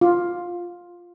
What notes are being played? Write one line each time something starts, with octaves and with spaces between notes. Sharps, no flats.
F4